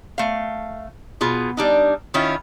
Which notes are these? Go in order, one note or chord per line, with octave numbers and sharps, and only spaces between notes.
A3 F5
B2 F4 G#4
G3 D4 D#4
D#3 C#4 E4 F4